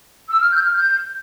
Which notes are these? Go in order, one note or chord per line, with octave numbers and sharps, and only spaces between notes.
E6
F6
G6
F6
G6